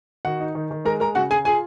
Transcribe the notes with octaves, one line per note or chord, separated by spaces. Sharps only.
D#3 F#4 F#5
D#4
D#3
D#3
G#3 A#4 A#5
G#3 A#4 A#5
C#3 F#4 F#5
C#3 G#4 G#5
F4 G#4 G#5